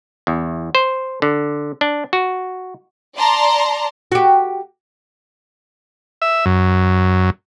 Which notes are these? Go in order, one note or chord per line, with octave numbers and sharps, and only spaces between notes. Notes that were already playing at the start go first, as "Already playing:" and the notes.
E2
C5
D3
D4
F#4
D5 A5 A#5 C6
F#4 G4
E5
F#2